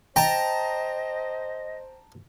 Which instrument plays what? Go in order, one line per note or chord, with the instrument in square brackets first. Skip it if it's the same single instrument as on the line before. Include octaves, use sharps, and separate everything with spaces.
[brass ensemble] C5 [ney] D#5 [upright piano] G5 [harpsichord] A5 A#5